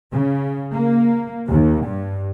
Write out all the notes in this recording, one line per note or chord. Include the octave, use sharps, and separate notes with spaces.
C#3
A#3
D#2
G2